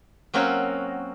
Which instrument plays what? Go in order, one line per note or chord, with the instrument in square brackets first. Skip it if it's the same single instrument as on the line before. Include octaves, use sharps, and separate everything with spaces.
[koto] F#3 A#3 C4 C#4 F#4